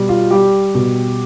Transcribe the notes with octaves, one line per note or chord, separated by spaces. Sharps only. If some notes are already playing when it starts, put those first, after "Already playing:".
Already playing: B2 G3
F4
G3 G4
B2